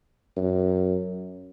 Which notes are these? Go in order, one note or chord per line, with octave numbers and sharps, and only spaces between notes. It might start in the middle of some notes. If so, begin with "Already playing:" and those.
F#2